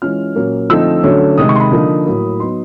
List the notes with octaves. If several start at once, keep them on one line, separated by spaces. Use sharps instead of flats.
E3 G#3 C#4 F4 F6
A#2 F#3 A#3 C#4
D3 F3 A3 C4 D#4 E6
D3 F#3 A3 C#4
C3 D#3 G#3 D#6
C#6
C6
B5
D3 F3 A#3 D#4
A2 F#3 A#3
F#3 B3 D#4 C6